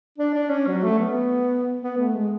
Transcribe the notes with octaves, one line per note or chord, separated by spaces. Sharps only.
D4
D4
C#4
F#3
A3
B3
B3
A3
G#3